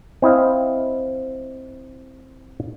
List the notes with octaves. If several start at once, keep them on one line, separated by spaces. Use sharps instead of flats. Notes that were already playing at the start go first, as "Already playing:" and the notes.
C4 E4 D#5 F5